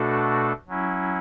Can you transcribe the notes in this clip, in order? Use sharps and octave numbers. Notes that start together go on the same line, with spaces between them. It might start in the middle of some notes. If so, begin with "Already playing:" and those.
Already playing: B2 A3 D4 F#4 A4
F#3 C#4 E4